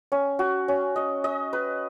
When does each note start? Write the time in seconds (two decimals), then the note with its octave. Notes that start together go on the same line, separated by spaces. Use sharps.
0.12 C#4
0.39 F#4
0.68 C#4
0.96 D#5
1.24 D#5
1.53 B4